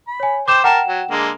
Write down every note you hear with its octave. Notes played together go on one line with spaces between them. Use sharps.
B5
C#5 G#5
C5 G5 D6 G6 E7
A#4 F#5 G5 A5 E7
F#3
D3 G#3 A#3